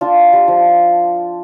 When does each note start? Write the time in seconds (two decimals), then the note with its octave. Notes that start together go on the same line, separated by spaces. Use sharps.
0.01 D4 F4
0.33 G3
0.48 F3